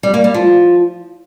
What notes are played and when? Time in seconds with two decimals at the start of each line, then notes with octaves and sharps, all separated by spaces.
0.03 G3
0.14 A#3
0.24 G3
0.34 F3